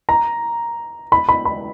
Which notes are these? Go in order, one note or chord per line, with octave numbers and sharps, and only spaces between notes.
A#5
B5
B5
B5